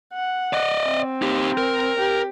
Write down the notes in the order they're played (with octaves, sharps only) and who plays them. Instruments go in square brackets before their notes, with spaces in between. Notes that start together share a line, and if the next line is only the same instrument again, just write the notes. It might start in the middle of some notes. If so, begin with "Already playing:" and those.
[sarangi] F#5
[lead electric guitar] D5 D#5
[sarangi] C4
[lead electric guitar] D#4 G4
A#4
[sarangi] G4